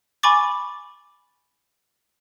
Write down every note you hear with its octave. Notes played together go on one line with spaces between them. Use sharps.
G#5 B5 C#6 D6 A6